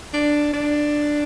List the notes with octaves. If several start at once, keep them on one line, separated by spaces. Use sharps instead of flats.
D4
D4